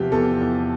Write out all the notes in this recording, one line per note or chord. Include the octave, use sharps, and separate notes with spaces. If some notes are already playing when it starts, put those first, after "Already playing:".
Already playing: E2 C3 F3 G4
E2 A4
E2